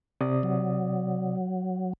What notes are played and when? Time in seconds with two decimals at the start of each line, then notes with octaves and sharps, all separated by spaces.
0.21 C3 D5 D#6
0.43 F#3